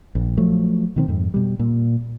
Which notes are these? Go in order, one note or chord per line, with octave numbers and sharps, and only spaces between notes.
A#1
F3 F#3 A3
B2 D#3 C4
F2 G#2
B2 G3
A#2